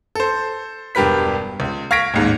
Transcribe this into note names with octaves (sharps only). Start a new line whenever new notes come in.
A4 C5
E1 G2 G4 A#4 B4 B6
C#2
F5 C#6 G#6 A#6 B6 D7
A1 D#2 G#2